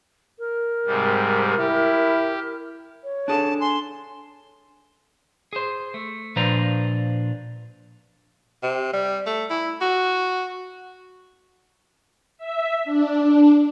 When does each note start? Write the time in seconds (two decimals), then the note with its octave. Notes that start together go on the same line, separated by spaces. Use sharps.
0.39 A#4
0.86 G#2 C3 G3
1.59 E4 G4
3.04 C#5
3.28 D4 G#4 A4 A5
3.60 G#5 C6
5.53 G#4 C5
5.94 A3
6.36 A#2 F3 D4 B4 C5 A#5
8.63 C3
8.93 G3
9.26 A3
9.50 E4
9.81 F#4
12.38 E5
12.84 D4